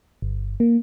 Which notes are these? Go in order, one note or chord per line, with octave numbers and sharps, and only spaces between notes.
G1
A#3